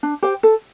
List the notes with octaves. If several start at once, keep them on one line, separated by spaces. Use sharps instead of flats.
D4
G4 C5 G5
A4